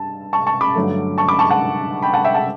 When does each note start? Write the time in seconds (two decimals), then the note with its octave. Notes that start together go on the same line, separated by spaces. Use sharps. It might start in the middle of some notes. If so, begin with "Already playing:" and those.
Already playing: G2 A5
0.33 A5 C#6
0.47 A5 C#6
0.61 B5 D6
0.75 G2 D3 F#3 A3
1.18 A5 C#6
1.28 B5 D6
1.39 A5 C#6
1.50 F#5 A5
2.03 G5 B5
2.14 F#5 A5
2.24 E5 G5
2.34 F#5 A5